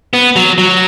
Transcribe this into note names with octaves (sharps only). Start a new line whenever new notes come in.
B3
F#3
F#3